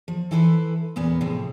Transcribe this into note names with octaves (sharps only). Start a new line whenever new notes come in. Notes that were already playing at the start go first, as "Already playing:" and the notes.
F3
E3 E4 A4 B4 C5
E2 A#2 B3 C#4
A2 C3 F3 G#4